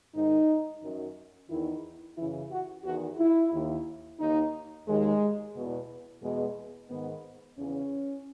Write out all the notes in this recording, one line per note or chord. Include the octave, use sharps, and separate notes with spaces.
G#2 D#3 D#4
F#2 D#3
E2 D#3 E4
F#2 C#3 E3 E4
F#4
E2 D#3 F#4
E4
D#2 D#3
D#2 D#3 D#4
D#2 D#3 G#3
E2 B2
E2 B2 G#3
G#2 D#3 B3
E2 C#3 E3 C#4